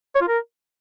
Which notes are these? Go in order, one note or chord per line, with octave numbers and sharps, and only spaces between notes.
C#5
F4
A#4